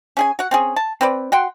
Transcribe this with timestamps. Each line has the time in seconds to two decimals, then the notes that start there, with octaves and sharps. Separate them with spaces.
0.17 C#4 G#4 G#5
0.39 F#4 F#5
0.51 C4 C#4 G#4
0.76 A5
1.01 C4 B4 D5
1.32 F#4 F#5 G5 C6